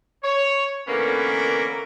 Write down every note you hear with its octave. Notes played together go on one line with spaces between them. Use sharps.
C#5
D3 E3 A#3 B3 C#4 A#4